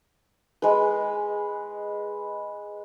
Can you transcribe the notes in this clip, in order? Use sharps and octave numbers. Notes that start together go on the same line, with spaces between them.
G#3 B4